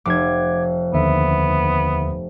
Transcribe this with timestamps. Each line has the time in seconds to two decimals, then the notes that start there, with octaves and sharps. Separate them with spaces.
0.06 F1 D6 G#6
0.93 D#2 D3 B3 E5